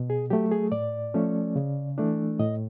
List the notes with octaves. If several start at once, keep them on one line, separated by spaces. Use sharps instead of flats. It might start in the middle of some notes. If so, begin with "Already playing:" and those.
Already playing: B2
G#4
F#3 A3 G4
G#4
A2 D5
F3 A3 C#4
C#3
E3 A3 D4
A2 D#5